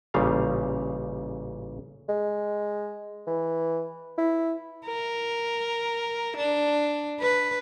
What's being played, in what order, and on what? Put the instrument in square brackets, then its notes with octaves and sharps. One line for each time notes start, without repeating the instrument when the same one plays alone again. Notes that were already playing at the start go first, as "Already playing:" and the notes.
[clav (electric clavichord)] A1 A#2 C#3 G3 F5
[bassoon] G#3
E3
E4
[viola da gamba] A#4
D4
B4